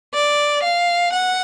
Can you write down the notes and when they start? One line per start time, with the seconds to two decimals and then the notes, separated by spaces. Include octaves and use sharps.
0.14 D5
0.63 F5
1.12 F#5